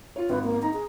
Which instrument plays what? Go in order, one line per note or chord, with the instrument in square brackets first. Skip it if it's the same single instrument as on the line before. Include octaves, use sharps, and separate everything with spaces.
[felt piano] F4 C#5
[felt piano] G#1 [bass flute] B4
[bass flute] A#3
[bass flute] D#4 [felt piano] A#5
[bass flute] G#4